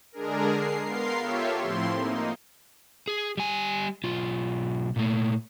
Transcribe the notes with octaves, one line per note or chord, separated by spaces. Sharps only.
D3 G#3 D4 G#4 A#4
C7
B3 A#4 F5 C6 C7
F4 G4 A4 C#5 E5
A2 F3 C4 E4 C6
A#3 D#4
G#4
G3 G#5
B1 F4
A#2 A3